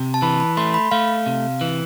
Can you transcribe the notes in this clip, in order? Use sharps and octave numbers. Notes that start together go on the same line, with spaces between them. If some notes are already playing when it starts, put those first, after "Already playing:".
Already playing: C3
A5
E3 B5
B5
A3 C6
B5
A3 F5
C3
E3